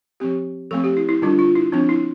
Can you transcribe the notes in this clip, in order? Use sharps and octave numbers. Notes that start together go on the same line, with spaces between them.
F3 C4 G4
F3 A3 C4 A4
G4
E4
E4
D3 G3 D4 F4
F4
E4
F3 C4 D4
E4